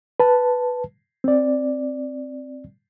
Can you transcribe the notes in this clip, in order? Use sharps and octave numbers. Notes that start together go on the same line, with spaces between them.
B4 A5
C4 D5